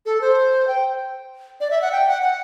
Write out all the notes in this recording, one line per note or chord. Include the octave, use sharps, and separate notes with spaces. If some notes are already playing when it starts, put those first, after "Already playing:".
A4
C5
G5
D5
E5
F#5
G5
F#5
F#5